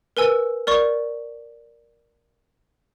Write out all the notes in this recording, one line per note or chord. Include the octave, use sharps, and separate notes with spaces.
A#4 B4 G#5 E6
A#4 D5 C#6